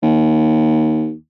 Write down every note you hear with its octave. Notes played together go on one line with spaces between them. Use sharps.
D#2